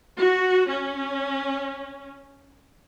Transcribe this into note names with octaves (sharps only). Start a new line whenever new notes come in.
F#4
C#4